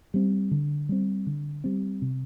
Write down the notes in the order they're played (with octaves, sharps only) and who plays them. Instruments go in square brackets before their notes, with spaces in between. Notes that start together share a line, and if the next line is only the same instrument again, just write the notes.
[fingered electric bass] G3 C4
D3
G3 C4
D3
G3 C4
C3